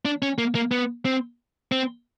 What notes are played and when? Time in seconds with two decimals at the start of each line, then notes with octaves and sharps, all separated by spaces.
0.05 D4
0.22 C#4
0.38 A#3
0.55 A#3
0.71 B3
1.05 C4
1.72 C4